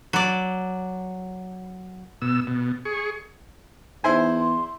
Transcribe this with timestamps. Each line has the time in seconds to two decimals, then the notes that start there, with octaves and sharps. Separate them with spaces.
0.13 F#3 D5
2.22 B2 E6
2.47 B2
2.85 G#4 C#6
4.04 E2 D#4 E4 C5 G#5
4.40 C6